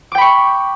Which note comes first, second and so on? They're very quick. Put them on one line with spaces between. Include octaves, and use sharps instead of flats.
D6 G5 B5 C#6